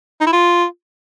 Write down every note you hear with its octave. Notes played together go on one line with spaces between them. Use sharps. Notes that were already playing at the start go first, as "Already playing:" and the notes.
D#4
E4
F4